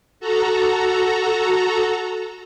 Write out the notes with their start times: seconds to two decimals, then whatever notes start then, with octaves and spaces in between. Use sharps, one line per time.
0.20 F#4 A4 A#5